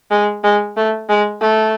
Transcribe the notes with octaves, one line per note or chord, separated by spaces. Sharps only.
G#3
G#3
A3
G#3
A3